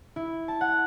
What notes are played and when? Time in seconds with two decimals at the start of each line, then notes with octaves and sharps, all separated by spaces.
0.16 E4
0.48 A5
0.61 F#5